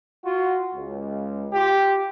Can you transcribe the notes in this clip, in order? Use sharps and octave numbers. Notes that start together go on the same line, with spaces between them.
F4 F#4
C#2
F4 G4